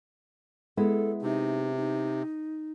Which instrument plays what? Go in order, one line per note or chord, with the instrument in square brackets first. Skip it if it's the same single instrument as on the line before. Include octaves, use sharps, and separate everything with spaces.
[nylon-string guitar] G#3 B3 E4 [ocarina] A4
[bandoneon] C3 [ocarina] D#4
[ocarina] D#4